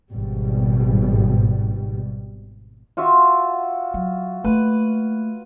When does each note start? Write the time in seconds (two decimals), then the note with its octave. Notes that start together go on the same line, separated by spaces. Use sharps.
0.12 G#1 B2 G3
2.97 F4 F#4 E5
3.94 F#3
4.44 A3 A#3 B4